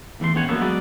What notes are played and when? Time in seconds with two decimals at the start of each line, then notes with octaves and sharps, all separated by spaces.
0.20 E2 E3 A3 C6
0.35 E2 A2 B3 C#4 C5 C#5
0.49 F#2 D3 A#3 B3 C#5 E5
0.61 F#3 G#3 B3 B4 D5